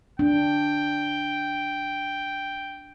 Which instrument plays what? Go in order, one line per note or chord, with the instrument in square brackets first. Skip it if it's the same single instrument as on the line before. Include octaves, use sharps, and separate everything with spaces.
[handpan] D4 [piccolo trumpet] G5